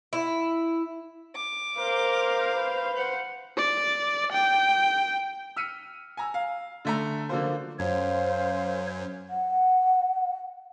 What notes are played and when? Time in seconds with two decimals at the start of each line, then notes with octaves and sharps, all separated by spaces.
0.13 E4
1.35 D6
1.77 A#4 C5 F5
2.56 B4
2.95 C5 F#5
3.57 D5
4.32 G5
5.56 E6 F6 B6 C#7 D#7
6.17 G#5 A#5 E6
6.34 F5
6.85 D3 A3 A#5
7.29 D3 F3 F#3 A#3 F4 C5
7.79 F#2 C5 C#5 F5
9.29 F#5